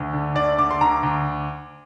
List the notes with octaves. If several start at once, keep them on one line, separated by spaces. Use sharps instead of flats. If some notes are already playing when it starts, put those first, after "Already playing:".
Already playing: D2
D3
D2 D5
D3 D6
C6
D2 A#5
D2